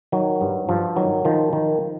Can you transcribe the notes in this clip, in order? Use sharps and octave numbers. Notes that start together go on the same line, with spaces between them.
D#3 F#3
G2
G2 F3
D#3 F#3
D#3 F3
D#3